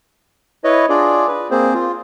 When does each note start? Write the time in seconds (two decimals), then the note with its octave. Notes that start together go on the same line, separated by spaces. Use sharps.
0.64 E4 B4 C#5 D#5
0.89 D4 F4 G#4 D5
1.27 B4
1.51 A#3 C4 G#4 C5
1.74 F4